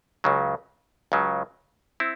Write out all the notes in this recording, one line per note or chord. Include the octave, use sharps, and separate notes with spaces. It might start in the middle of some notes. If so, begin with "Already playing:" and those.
C#2 C#3 F#3
C#2 C#3 F#3
C4 E4